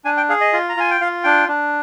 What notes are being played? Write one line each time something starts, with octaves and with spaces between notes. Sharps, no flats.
D4 G#5
G5
G#4 F5
D#5
F4
A#5
F4 G#5
G5
F4 F5
D4 G5
D4